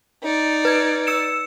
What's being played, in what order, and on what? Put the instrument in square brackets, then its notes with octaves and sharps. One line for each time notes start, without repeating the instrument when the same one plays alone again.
[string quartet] D#4 D5
[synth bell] B4 G#6
E6 C#7 E7